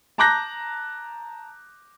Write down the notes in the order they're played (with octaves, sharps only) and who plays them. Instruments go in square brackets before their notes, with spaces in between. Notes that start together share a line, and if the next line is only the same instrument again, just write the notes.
[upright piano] A5 A#5 D6 F#6 G6 A#6